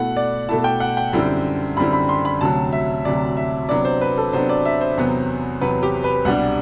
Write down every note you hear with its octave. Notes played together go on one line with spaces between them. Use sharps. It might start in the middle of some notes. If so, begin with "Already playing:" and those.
Already playing: B2 A3 E4 F#5
D5
B2 A3 E4 A5
G5
F#5
G5
F#2 D3 G3 C4 E4
F#2 D3 G3 C4 E4 B5
B5
C6
B5
D2 C3 F#3 A5
E5
D2 C3 F#3 D5
E5
C3 F#3 B3 D4 D5
C5
B4
A4
C3 F#3 B3 D4 C5
D5
E5
C5
E2 C3 F#3 B3
E2 C3 F#3 B3 B4
G4
B4
C2 B2 G3 D4 F#5